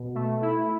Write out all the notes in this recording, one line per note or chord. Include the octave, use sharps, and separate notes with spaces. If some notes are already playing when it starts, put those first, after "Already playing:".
Already playing: B2
A3
E4